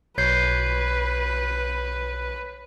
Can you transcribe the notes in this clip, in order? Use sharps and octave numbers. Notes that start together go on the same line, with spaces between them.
B1 B4 C#5 G6 C7